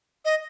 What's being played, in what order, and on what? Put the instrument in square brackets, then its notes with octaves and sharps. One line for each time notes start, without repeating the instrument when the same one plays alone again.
[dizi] D#5